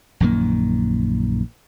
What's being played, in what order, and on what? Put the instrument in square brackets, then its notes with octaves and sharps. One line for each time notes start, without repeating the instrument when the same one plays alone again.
[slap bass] A#1 F#2 D#3 A#3